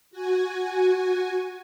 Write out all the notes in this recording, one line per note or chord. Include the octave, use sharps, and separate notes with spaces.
F#4 G#5